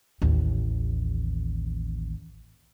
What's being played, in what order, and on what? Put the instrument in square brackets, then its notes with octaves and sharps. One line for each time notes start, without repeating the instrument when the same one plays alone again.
[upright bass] A1 D#2